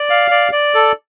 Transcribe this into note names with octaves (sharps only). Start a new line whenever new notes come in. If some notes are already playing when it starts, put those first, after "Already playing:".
Already playing: D5
F5
D5
D5
A4